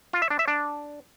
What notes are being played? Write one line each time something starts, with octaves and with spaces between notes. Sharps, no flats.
F4
E5
D4
E5
D4